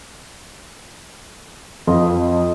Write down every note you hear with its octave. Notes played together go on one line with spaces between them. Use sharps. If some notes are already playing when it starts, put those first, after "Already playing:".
F2 F4 D#5